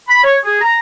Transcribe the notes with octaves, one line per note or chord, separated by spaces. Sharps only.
B5
C#5
G#4
A#5